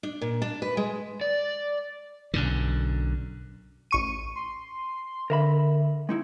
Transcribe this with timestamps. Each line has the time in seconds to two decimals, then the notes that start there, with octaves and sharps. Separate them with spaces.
0.03 D4
0.21 A#2
0.42 D4
0.62 B4
0.77 G#3
1.21 D5
2.34 B1 F#2 D3
3.91 A1 C#6 D#7
4.35 C6
5.30 D3 A#4 E5 B5
6.09 G#3 D#4 E4